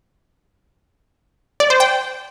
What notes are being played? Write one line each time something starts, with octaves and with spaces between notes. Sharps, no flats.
D5
C5
G5